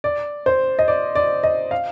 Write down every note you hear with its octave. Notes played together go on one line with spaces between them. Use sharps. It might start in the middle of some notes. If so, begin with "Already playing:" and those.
D5
C5
D#5
D5
D5
D#5
F5